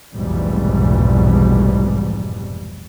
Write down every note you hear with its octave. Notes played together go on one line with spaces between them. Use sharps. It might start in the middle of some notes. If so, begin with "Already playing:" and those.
F1 B1 G#2 B2 E3 G3